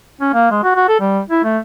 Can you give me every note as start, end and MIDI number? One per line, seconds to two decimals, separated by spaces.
0.21 0.31 61
0.34 0.50 58
0.51 0.61 56
0.64 0.72 66
0.76 0.87 66
0.88 0.99 69
1.00 1.21 55
1.29 1.43 64
1.44 1.58 57